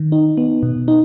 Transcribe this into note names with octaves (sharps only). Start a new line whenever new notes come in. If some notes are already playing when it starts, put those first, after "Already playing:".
Already playing: D#3
D#4
B3
B2
D#4